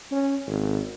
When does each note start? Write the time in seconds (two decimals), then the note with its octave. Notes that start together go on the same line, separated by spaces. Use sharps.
0.11 C#4
0.47 G#1